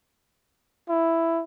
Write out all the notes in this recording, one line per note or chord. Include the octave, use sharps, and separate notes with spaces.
E4